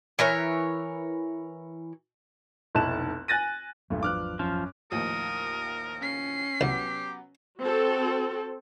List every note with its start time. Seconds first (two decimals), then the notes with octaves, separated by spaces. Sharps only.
0.19 E3 A#4 C#5
2.75 F1 B1 E4 A5 F#6 E7
3.28 G#5 F#6 A6 A#6 D#7
3.90 G#1 E2 G2 A#2 F#3 A3
4.03 F3 D4 B4 D6 F6 F#6
4.39 F#2 F3
4.92 A1 D#2 F3 A#4 D#6
6.02 C#4 C7
6.61 C2 F#3 B3 G4
7.61 C4 F#4 A4